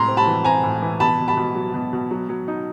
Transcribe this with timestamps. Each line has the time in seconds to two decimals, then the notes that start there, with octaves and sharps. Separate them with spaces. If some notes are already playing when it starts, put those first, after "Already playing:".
Already playing: A2 C3 A#5 C6
0.08 C4
0.17 A5 B5
0.27 E3
0.45 C4 G#5 A#5
0.63 A2
0.82 E3
1.00 B2 A5 B5
1.19 B2
1.28 A5 B5
1.37 B2
1.55 F#3
1.74 B2
1.93 B2
2.11 F#3
2.29 F#3
2.48 D#4